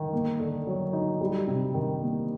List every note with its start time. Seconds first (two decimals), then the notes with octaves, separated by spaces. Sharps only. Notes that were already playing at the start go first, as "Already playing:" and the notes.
Already playing: D#3
0.13 A#3
0.40 D3
0.67 F#3
0.93 D#4
1.21 G3
1.47 C3
1.74 D#3
2.01 A#3